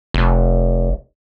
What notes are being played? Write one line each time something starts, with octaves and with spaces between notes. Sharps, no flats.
F1